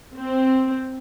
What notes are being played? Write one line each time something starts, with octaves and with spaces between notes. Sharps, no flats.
C4